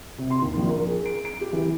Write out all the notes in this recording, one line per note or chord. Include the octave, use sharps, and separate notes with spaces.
C3
C6
D#2
A#1
A#4
G#4
D7
D7
G4
E3